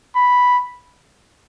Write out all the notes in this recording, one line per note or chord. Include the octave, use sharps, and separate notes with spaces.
B5